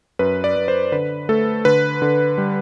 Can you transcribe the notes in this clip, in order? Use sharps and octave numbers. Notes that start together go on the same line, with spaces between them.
F#2 B4
D5
F#2
C5
D3 B4
A3 A4
D3 B4
D3
G3